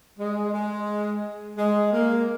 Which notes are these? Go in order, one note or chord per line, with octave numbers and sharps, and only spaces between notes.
G#3
G#3
G#3
A#3